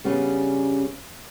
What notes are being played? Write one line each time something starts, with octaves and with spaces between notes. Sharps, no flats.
C#3 G3 B3 C#4 D4